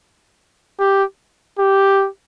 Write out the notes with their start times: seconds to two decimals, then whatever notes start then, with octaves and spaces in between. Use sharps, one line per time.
0.79 G4
1.59 G4